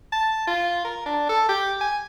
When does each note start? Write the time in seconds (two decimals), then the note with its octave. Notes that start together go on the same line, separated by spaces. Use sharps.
0.12 A5
0.48 F4
0.84 A#4
1.06 D4
1.29 A4
1.49 G4
1.81 G#5